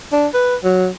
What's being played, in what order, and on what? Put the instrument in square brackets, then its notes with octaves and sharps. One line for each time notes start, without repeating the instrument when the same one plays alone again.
[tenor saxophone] D4
B4
F#3